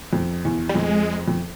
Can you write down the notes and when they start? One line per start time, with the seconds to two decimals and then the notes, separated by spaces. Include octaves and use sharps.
0.13 F2
0.45 E2
0.69 G3
0.75 F2 G#3
1.28 F2